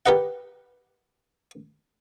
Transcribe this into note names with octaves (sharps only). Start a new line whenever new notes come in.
G4 A#4 B4 D#5 F#5